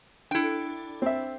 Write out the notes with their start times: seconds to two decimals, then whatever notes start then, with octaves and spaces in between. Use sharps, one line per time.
0.31 D4 E4 A4 G5
1.02 C4 E5